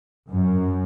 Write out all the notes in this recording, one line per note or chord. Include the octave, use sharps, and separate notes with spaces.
F#2